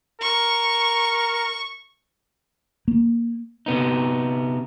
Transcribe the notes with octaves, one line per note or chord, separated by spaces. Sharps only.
A#4 C#6
A#3
C3 B3 D#4